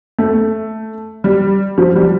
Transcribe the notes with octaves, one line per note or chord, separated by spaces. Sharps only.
A3
G3
F3
G3